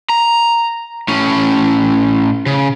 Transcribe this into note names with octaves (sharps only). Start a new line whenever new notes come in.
A#5
A2 C#4
C#3